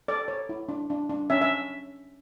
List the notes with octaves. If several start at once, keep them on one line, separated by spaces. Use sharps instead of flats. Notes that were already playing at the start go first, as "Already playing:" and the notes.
A4 D5
C#5
E4
D4
D4
D4
C#4 E5
E5